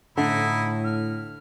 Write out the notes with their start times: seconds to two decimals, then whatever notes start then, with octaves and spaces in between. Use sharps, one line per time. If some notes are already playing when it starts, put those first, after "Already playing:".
0.17 A2 D3 D#4 E4
0.84 F6